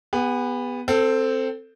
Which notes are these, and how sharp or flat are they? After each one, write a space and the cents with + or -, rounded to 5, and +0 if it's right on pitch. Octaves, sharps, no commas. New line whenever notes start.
B3 +0 G#4 -45
C4 +0 A4 +20